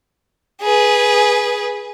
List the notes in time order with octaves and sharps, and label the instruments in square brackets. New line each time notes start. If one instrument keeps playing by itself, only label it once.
[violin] G#4 B4